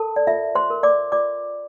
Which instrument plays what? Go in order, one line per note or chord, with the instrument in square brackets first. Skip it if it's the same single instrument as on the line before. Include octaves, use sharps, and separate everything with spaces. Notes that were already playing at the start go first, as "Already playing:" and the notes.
Already playing: [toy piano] A4 A#4 A5
D5
F4 E5
C5 C6
A#4
D5 D6
F4 D5 D6